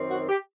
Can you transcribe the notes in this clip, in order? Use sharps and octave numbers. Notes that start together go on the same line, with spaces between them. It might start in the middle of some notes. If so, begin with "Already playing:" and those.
Already playing: F#2 D#3 C4
F#4
G4